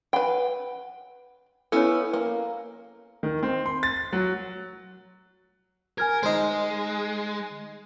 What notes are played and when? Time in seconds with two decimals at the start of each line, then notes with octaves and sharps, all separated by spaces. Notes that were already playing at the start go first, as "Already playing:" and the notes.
0.13 B4 F#5 G5 B5
1.72 B3 C#4 E4 A4 C#5
2.13 A#3
3.23 D#3
3.43 C4
3.66 C6
3.83 A6
4.13 F#3
5.98 A#4 G#5 F6 G#6
6.23 G#3 D#4 C5